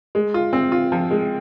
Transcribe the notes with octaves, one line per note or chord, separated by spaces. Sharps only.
G#3
F4
C4
F4
F3
G#3